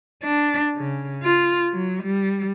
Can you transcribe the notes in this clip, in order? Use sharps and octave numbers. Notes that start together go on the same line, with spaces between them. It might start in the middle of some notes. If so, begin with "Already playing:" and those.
D4
C#3
F4
F#3
G3